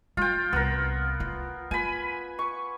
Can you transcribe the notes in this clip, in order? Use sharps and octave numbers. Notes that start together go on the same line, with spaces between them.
G#3 F4 G5
C2 B3 A#4
F4
F4 G#5 B5
C#6